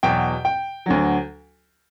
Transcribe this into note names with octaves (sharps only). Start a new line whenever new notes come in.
E2 B2 F#3 G5
G5
D2 D3 F#3